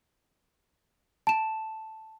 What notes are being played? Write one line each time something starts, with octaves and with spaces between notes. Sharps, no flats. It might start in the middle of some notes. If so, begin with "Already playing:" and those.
A5 E7